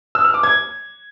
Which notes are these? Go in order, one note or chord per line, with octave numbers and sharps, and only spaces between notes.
E6
F6
D6
G#6